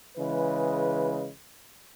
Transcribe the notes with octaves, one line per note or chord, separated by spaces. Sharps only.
C#3 E3 G#3 B4